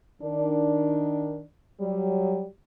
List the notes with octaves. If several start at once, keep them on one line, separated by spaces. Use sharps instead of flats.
D#3 D4
F#3 G3